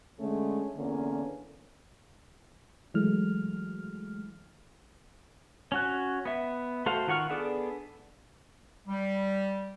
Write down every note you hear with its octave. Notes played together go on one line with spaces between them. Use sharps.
D3 G#3 A3 C#4
E2 D3 A#3 C#4
E3 F#3 G#3 A3 F6
C#4 F#4 F#6
B3 E5
A3 F#4 A4 C5 F5
D#3 F4 F#5 C#6 F6
B3 D4 G#4 A4 D5
G3